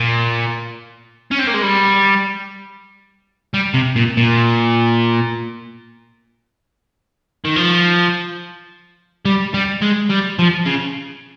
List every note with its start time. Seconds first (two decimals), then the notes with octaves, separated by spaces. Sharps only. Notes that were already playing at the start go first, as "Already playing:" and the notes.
Already playing: A#2
1.31 C#4
1.39 C4
1.48 A#3
1.54 G#3
1.63 G3
3.54 G3
3.74 C3
3.96 A#2
4.17 A#2
7.45 D#3
7.56 F3
9.25 G3
9.54 G3
9.81 G#3
10.09 G3
10.39 F3
10.66 C#3